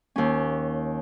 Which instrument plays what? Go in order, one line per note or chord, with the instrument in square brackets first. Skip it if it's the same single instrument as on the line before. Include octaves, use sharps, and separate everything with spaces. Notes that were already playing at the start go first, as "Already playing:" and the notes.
[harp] D#2 C#4